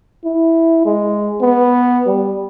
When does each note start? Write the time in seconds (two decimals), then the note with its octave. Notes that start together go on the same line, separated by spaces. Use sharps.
0.24 E4
0.85 G#3
1.41 B3
2.07 G3